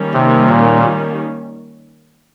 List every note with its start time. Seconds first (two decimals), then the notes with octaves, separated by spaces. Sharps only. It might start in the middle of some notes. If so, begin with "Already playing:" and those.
Already playing: D#3 G3 A#3 C#4
0.14 C3
0.49 A#2